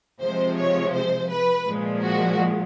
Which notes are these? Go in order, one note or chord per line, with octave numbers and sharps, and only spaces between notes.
C3 F3 G#3 C5
C#5
C5
B4
A#2 F3 G#3
F#4